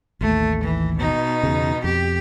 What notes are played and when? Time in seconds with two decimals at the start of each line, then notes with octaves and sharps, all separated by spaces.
0.21 A1 D#2 A3
0.64 E3
0.98 B2 D#4
1.43 E2 C#3
1.84 F2 G4